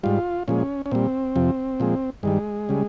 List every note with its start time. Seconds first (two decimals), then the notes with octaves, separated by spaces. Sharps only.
0.03 G#2 G3 F4
0.48 A#2 F3 G#3 C#4
0.86 C#4
0.91 A#2 G3 C4
1.35 F2 C3 F3
1.80 A#2 F3 G#3
2.23 G2 D#3 G3 G#3
2.69 C#3 G3